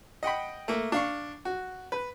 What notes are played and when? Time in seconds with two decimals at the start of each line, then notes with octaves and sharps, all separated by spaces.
0.23 D#5 F#5 G5 B5
0.68 A3 A#3
0.92 D4 F5 C#6
1.45 F#4
1.92 B4